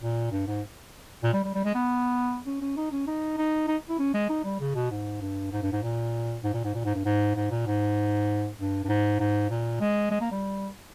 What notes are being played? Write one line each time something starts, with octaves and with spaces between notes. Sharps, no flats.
A#2
G2
G#2
A#2
G3
G3
G3
G#3
B3
C#4
C#4
D#4
C#4
D#4
D#4
D#4
E4
C#4
G#3
D#4
G3
C#3
B2
G#2
G2
G#2
G2
G#2
A#2
G#2
A#2
G#2
A#2
G#2
G2
G#2
G#2
A#2
G#2
G2
G2
G#2
G#2
A#2
G#3
G#3
A#3
G3